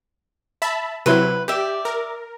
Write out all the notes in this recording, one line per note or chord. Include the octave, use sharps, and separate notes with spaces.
E5 A5 B5
C3 F#3 E4 B4 C6
G4 D5 E5
A#4